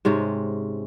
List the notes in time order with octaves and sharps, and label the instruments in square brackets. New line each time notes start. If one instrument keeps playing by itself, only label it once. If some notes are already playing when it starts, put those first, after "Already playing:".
[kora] G#2 C3 G#3 C#4